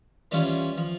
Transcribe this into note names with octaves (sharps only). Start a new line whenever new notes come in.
E3 G3 C#4 F4
F3